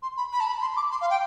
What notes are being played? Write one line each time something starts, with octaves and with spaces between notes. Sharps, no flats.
C6
B5
B5
A5
B5
C6
D6
C6
F5
G5